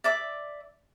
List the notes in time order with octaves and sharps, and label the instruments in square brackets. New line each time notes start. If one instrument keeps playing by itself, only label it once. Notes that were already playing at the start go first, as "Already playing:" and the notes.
[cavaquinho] D5 E5 D6